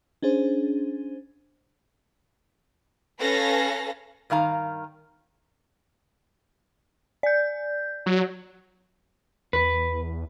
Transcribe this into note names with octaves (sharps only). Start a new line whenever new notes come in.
C#4 D4 G#4 C5
C#4 A4 B4 F5 A#6
G2 D#3 F5 A#5
D5 G6
F#3
E2 B4